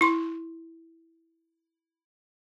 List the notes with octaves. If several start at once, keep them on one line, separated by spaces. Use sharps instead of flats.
E4 C6